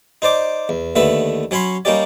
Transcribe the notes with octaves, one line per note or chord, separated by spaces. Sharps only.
D#4 C5 D5 D6
E2
D#2 D3 A3 B3 B4 E5
F#3 C#4 C#5 B5 C6
G3 A#3 C#4 D#4 G4 D5